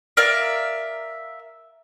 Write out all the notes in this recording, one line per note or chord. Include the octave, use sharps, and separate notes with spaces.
A#4 D5 E5 F5